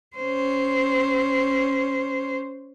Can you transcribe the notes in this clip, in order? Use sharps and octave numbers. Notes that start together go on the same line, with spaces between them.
C#4 C5